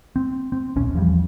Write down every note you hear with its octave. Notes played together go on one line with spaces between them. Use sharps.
C4
C4
D#1 B1 C#4
E2 F3 G3